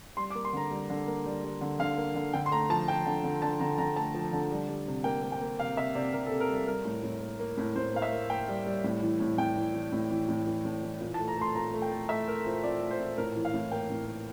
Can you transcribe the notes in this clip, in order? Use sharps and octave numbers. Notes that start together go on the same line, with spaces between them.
G3 C6
D6
A#3
C6
D3 A#5
G3
D3
A#3
G3
G3
D3
D3 F5
A#3
D3
D3 G5
C6
A3 A#5
F3 A5
F3 G5
D3
D3
D3 A5
D3 A#5
D3 A#5
A3 A5
F3
D3
G3
G3
C3
A#3 G5
A#3
G5
A#3
C3 F5
C3 E5
C3 D5
C3 A#4
A4
C3
A#4
G3 A4
G3 A#4
A2
A2
A#3
A#3
A2
A2 C5
A#3 F5
E5
A#3
A#3 G5
G3
G3
A2
E3
A2
A2 G5
E3
E3
A2
E3
A2
E3
A2
E3
A#2
A5
A3
A#5
A3 C6
A#2 A#5
A3
G5
A3
A3 E5
A3 A#4
A#2 C5
A#2 D5
A3
C5
A#2
A2 A#4
E3
F5
A2
A#3 G5
A2
A#3